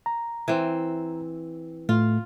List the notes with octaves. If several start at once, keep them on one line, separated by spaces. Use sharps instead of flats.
A#5
E3 C4
A2 A3 F4